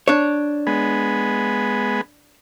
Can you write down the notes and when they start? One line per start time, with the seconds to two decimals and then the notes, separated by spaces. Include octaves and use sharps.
0.08 D4 C#5
0.67 G#3 B3